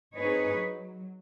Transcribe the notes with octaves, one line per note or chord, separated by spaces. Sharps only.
C4 D#4 G#4 B4 C#5
F#3